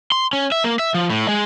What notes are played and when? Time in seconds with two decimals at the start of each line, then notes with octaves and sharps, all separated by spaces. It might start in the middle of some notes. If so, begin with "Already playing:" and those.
0.12 C6
0.33 C#4
0.52 E5
0.64 A#3
0.79 E5
0.94 F3
1.10 A2
1.28 G#3